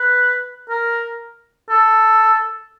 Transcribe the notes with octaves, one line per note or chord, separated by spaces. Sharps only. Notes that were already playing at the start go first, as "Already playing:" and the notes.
Already playing: B4
A#4
A4